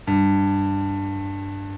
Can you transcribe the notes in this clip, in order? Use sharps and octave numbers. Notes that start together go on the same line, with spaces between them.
G2